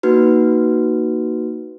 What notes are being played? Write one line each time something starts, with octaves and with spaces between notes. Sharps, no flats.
A#3 D#4 F#4 B4